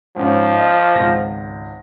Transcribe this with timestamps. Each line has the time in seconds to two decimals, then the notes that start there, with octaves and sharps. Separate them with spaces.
0.16 G#2 F3 C#4
0.54 D#5
0.95 G#1 C#2 A#6